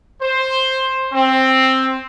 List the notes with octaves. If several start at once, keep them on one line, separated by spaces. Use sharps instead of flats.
C5
C4